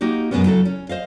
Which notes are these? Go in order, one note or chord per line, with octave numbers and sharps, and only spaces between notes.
A#3 D#4 F#4 G4
F#2 B2 G#3 B3 C#4
C#3 F#3 E4 A4
C#4
C5 D#5 F5